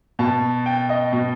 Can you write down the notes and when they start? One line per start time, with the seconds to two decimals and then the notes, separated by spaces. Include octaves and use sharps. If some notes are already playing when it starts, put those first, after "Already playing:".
0.19 B2 A5
0.66 G5
0.89 D#5
1.12 B2